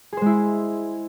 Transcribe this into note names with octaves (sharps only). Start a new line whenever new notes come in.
G#3 E4 G#4 C5